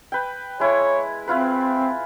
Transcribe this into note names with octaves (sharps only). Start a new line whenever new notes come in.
B4 G5
G#3 E4 C#5
C4 E4 F4 B4